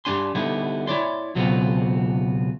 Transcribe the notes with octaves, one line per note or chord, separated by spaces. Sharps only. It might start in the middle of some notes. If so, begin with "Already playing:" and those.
G2 G3 A#3 D4 G#5 C6
D3 G3 B3 D#4 E4
E4 C#5 D5 C6
C#2 B2 F#3 B3 C4 F4